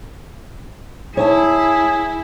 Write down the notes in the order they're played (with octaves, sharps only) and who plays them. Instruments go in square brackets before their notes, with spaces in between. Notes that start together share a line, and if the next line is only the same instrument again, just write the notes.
[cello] E4 [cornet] G#4 [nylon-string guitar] C#5 G#5 A5